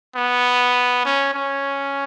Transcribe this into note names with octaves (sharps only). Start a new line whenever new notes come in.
B3
C#4
C#4